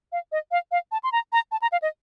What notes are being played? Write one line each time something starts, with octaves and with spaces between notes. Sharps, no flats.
F5
D#5
F5
F5
A5
C6
A#5
A#5
A5
A#5
F5
D#5